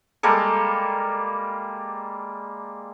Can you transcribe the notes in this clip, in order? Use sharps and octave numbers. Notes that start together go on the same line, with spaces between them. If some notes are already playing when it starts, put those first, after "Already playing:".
G3 G#3 A#3 A4